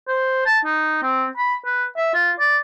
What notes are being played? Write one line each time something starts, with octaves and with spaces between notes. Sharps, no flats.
C5
A5
D#4
C4
B5
B4
E5
F4
D5